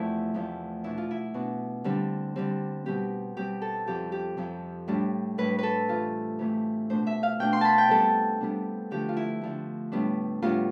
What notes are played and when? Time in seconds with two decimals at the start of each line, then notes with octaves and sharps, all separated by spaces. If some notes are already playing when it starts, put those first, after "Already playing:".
Already playing: E2 C3 F3 A3 E4
0.34 E2 C3 F3 A3
0.84 B2 B3 D4 E4
0.98 F4
1.11 E4
1.34 B2 B3 D4
1.84 D3 G3 C4
2.36 D3 G3 C4
2.86 B2 G3 C4 G4
3.36 B2 G3 C4 G4
3.62 A4
3.87 F2 C3 F3 G4
4.12 G4
4.37 F2 C3 F3
4.88 A2 G3 D4
5.38 A2 G3 D4 B4
5.58 A4 B4
5.88 C3 E3 A3 F4
6.39 C3 E3 A3
6.90 B2 A3 D4 C5
7.07 E5
7.23 F5
7.39 B2 A3 D4 G5
7.53 C6
7.61 A5 B5
7.78 G5
7.88 C3 G3 B3 D4 A4
8.41 C3 G3 B3 D4
8.91 D3 F3 A3 G4
9.09 F4
9.17 E4
9.41 D3 F3 A3
9.92 A2 G3 B3 D4
10.42 A2 G3 B3 D4 F4